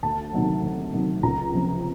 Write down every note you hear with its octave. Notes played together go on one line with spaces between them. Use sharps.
D2 A5
C3 D#3 F#3
D2
C3 D#3 F#3
C#2 A#5
C3 F3